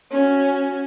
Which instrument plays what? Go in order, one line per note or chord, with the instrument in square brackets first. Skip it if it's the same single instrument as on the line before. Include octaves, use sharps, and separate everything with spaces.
[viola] C#4 F#4